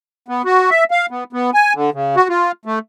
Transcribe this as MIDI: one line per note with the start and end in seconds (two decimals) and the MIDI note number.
0.28 0.42 59
0.45 0.70 66
0.70 0.84 76
0.91 1.06 77
1.10 1.24 59
1.33 1.51 59
1.54 1.73 80
1.75 1.90 50
1.94 2.16 49
2.17 2.28 66
2.29 2.52 65
2.65 2.79 57